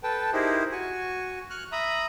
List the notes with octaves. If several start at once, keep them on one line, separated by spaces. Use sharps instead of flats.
A4 B4 G5 A5
D#4 E4 G4 G#4 A#4 C5
F#4 G#5 C#6
C#6 F6 F#6
E5 A#5 B5 D#6